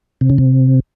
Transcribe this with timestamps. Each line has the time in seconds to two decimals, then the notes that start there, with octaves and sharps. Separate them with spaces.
0.21 C3
0.30 C#3
0.38 C3